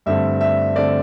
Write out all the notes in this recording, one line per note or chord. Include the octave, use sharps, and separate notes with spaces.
G2 D3 A3 C4 E5
E5
D3 A3 C4 D5